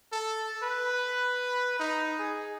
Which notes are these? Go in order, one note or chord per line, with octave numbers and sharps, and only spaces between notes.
A4
B4
D#4
G#4